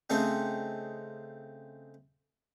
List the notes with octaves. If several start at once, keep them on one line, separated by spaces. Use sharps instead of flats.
C#3 A3 C4 D#4